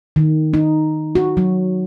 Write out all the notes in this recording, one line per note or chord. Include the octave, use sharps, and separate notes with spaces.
D#3
D#4
F#4
F#3